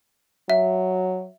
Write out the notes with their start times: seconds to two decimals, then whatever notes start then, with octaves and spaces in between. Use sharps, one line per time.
0.50 F#3 E5